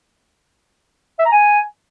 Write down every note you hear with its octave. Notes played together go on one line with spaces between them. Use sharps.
E5
A#5
G#5